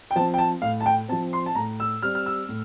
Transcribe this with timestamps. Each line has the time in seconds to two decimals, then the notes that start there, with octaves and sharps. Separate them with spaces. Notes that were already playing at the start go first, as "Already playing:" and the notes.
0.11 G5
0.16 F3 A5
0.19 C4
0.34 G5
0.38 A5
0.62 A2 F5
0.80 A5
0.86 G5
1.09 C4 A5
1.12 F3
1.33 C6
1.46 A5
1.55 A2 A#5
1.80 E6
2.02 G3 C4 F6
2.15 F6
2.26 E6
2.49 A2